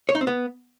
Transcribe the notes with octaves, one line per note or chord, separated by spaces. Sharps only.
C#5
D#4
C4
B3